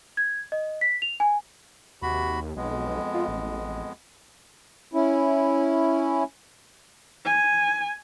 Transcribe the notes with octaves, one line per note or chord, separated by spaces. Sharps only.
G#6
D#5
B6
F7
G#5
D#2 C3 F#4 B5
B1 F2 G#3 B3
F4
A1
C#4 E4
G#5